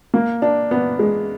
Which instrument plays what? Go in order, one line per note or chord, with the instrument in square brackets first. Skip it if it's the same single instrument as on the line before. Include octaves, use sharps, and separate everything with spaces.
[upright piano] A#3
D4
B3
G#3